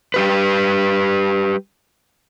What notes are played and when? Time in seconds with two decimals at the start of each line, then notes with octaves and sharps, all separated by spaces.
0.14 G3 G4 B4